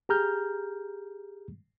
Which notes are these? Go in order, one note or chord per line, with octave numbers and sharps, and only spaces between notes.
G4 G#4 A#5 F6 G6